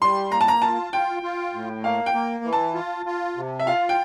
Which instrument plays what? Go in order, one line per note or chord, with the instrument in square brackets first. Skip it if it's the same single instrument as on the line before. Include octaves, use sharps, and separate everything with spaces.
[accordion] G3 [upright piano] C6
[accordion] A#3 [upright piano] A#5
[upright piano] A5
A#5
[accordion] F4 [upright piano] A5
[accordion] F4 [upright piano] G5
[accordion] F4
A2
[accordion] A#3 [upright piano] F5
[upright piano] G5
[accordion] A#3
E3
[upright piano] A5
[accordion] F4
F4
C3
[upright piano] E5
[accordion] F4 [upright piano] F5
[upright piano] G5